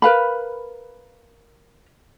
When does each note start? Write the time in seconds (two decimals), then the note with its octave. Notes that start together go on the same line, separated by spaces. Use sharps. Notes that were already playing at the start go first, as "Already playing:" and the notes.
0.02 A#4 B4 F5 B5